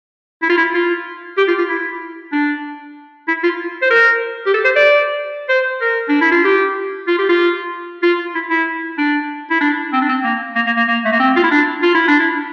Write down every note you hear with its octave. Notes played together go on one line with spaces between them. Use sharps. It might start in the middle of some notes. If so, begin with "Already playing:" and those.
E4
F4
E4
F4
G4
F4
F4
E4
D4
E4
F4
C5
A#4
G4
A4
C5
D5
C5
A#4
D4
E4
F4
G4
F4
G4
F4
F4
E4
E4
D4
E4
D4
C4
D4
C4
A#3
A#3
A#3
A#3
A#3
A3
A#3
C4
F4
E4
D4
F4
E4
D4
E4